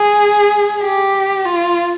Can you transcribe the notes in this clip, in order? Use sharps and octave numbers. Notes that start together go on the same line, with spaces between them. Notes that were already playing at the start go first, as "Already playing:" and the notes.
Already playing: G#4
G4
F4